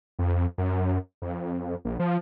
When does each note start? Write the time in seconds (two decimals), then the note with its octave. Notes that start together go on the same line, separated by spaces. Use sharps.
0.19 F2
0.58 F#2
1.22 F2
1.85 A#1
2.00 F3